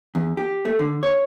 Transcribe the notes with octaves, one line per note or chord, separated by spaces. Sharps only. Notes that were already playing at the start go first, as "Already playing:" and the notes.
E2
G4
A3
D3
C#5